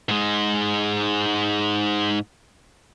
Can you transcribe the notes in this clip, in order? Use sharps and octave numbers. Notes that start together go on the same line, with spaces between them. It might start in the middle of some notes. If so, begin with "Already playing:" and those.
G#2 G#3